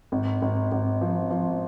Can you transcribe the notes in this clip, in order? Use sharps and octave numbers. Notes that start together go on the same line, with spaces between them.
G#1
G#1
G#1
F3
F3